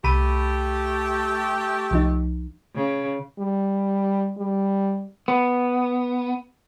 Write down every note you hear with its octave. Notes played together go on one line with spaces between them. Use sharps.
C2 A3 G4 B5 D#7
C2 F3 D#4
C#3
G3
G3
B3